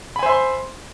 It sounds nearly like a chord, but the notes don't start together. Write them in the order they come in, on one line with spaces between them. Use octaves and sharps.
B5 G#5 C5 E5 C6